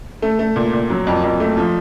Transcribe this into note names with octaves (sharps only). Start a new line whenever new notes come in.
A3
A3
A#2
A#2
F#3
F2
F2
A3
F3